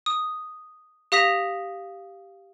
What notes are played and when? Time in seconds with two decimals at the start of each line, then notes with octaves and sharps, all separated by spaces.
0.06 D#6
1.12 G4 F5 D#6 A#6 B6 F7